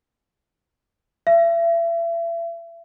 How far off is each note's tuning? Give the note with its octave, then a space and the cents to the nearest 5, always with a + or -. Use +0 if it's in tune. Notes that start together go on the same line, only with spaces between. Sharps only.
E5 +35